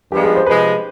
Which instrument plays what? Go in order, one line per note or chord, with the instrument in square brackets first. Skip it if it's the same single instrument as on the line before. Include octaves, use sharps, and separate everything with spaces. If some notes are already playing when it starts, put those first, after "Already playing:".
[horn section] G2 F3 G#3 B3 F4 [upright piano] G4
[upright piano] G#4
C5
[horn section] C3 F3 G#3 [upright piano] B4